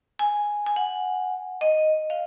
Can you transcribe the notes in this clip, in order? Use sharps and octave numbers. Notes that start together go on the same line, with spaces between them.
G#5
G#5
F#5
D#5
F5